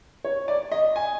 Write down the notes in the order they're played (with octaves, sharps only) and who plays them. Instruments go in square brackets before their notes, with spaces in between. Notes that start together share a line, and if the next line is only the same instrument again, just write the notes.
[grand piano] C#5
D5
D#5
G#5